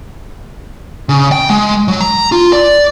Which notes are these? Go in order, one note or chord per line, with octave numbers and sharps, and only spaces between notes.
C#3
G5
G#3
F#3
A#5
F4
D5